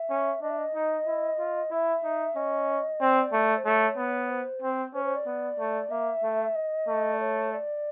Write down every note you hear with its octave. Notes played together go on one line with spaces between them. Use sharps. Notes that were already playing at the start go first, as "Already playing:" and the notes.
Already playing: E5
C#4
D4 D#5
E5
D#5
D#4
E4
F4
E4 E5
D#4
C#4 D#5
C4 D5
A3
C5
A3 C#5
B3
C5
C4
C#4 C5
C5
D5
B3
A3
A#3 E5
A3
D#5
A3
D5
C#5
D5